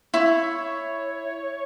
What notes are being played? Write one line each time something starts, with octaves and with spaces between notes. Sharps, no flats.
E4 C#5